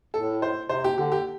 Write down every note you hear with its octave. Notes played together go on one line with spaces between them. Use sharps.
A2 A4
C5
C3 C5
G4
D3 G4
G4